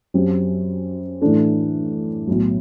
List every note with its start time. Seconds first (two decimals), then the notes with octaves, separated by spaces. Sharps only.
0.14 F#2 F#3 C4 G4
1.21 A2 E3 A3 D4 A4
2.27 B1 A2 F#3